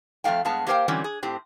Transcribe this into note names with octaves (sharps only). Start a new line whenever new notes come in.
F2 G3 A3 F5 G5
G2 G#3 B3 F5 A5
A#3 G4 A#4 C5 F5 G5
D3 E3 F#3 G3 C4 C#4
G#4
A2 C4 G4